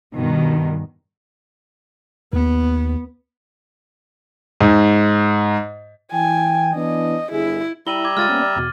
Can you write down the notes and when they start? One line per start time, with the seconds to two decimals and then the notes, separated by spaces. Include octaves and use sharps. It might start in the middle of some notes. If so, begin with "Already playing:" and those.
0.14 G2 B2 D#3
2.33 D#2 B3
4.60 G#2
6.12 E3 G5 G#5
6.75 E3 B3 D4 D#5
7.32 G1 E4 G#4
7.87 G3 E4 E5 A#5 D#7 F#7 G7
8.05 D6 G#6
8.17 G#3 F4 F6 A6 D#7
8.29 A#3 B3 C#4
8.42 D5
8.56 E2 B2